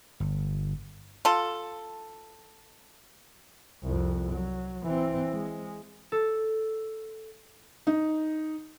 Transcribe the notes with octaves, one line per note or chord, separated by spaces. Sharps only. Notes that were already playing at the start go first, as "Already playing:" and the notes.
G1
F4 A4
C2 F2
F#3
E3 C4
G#3
A4
D#4